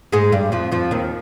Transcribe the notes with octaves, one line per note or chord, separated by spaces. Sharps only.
G#2 G#3
G2 G3
F2 F3
F2 F3
D#2 D#3